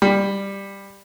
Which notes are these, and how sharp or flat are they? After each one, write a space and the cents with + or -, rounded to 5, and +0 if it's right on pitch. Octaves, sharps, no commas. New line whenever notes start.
G3 +10